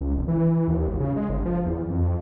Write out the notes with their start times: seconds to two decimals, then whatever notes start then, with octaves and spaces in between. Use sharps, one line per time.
0.01 C#2
0.16 F1
0.28 E3
0.51 E3
0.68 D#2
0.88 G#1
1.00 C#3
1.16 G#3
1.29 G1
1.45 F3
1.66 E2
1.90 F2